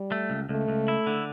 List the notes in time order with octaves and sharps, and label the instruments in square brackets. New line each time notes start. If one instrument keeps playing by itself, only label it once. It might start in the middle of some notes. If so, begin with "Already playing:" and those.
Already playing: [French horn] G3
[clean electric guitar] A3
C#2
[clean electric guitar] C#2 [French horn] A3
[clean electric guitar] C#2
E4
D3